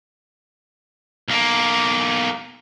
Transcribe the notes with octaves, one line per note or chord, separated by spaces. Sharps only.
B1 A#3